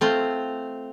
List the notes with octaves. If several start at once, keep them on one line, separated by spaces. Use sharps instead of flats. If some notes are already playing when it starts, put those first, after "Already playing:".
A3 C4 F4